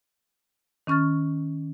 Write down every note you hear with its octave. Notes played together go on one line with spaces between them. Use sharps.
D#3 C#4 C#6 F6 A6